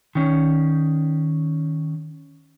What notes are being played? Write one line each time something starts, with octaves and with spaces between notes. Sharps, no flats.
D#3 C#4